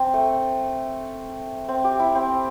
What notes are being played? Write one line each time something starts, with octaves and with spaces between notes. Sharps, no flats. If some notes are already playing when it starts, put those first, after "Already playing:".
Already playing: C4
A3
C4
G4
E4
C4